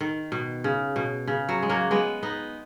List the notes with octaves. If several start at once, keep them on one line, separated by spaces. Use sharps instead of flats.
D#3
B2
C#3
B2
C#3
F#3
G#3
F#3 A#3
G#3 B3
B3 D#4